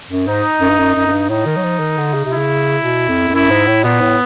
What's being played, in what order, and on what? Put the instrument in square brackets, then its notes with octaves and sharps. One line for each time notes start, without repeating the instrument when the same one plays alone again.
[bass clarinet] F#2
[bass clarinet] G#2 [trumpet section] D#4
[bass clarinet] F#2
G2
F#2
F#2
F#2
G2
[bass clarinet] A2 [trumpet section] D#4
[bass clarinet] D#3
F#3
F3
D#3
D3
C#3
C3
[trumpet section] E4
[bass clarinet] C#3
B2
F2
F2
[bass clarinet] F#2 [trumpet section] E4
[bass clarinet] G#2
A2
[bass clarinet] A#2 [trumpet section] B3
[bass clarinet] A2